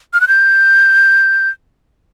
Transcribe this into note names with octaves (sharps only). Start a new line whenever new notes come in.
F6
F#6
G6